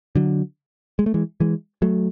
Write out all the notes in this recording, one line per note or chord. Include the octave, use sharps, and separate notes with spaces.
D3 F#3
G#3
A3
E3 G#3
E3 G#3
F#3 A3